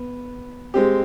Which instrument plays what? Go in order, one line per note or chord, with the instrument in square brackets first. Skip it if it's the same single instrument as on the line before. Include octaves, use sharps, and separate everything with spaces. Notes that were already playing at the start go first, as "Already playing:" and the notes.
Already playing: [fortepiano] B3
G#3 C4 G4